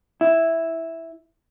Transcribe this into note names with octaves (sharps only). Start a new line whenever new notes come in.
E4